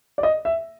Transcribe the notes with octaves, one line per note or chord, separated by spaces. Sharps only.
D5
D#5
E5